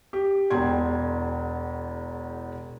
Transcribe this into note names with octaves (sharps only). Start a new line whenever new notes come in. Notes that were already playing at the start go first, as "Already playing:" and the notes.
G4
E1 E2 G5 C6 G#6